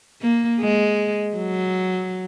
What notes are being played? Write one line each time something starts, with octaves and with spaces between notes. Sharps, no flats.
A#3
G#3
F#3